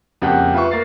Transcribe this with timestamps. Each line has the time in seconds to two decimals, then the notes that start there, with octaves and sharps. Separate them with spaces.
0.22 F2 C#3 A#3 G4 F#5 F#6
0.54 F4 B4 E5 B5 C#6
0.71 A#3 A#4 A6 C7